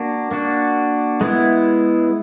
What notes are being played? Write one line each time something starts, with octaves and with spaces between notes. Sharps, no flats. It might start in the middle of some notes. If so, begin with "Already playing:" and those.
Already playing: A#3 D4 F#4
A#3 D4 F#4
G#3 B3 E4